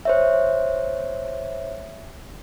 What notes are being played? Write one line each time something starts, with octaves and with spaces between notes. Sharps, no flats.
C5 C#5 E5